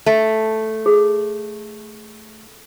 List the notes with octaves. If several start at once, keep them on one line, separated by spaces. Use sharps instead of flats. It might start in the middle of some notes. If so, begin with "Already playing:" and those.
A3
G#4